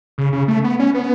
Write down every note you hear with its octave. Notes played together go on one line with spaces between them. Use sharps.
C#3
C#3
A3
B3
C#4
B3